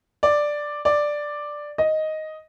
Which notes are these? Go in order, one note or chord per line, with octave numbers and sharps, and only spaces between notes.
D5
D5
D#5